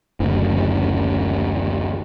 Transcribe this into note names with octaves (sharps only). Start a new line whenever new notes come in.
F#1 D2